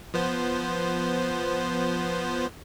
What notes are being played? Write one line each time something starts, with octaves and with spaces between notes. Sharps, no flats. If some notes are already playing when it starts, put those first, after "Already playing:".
F3 B3 C5